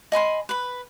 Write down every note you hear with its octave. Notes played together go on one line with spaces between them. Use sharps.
D#5 G#5 B5 C6
B4 B5